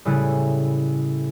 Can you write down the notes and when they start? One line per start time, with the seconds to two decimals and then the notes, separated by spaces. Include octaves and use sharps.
0.05 A2 C#3 G3 E4 G#5 F#6